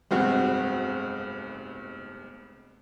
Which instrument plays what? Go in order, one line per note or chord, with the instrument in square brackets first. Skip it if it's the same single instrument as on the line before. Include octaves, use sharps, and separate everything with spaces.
[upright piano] F1 B1 G2 [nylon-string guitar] G#3 C4 F#4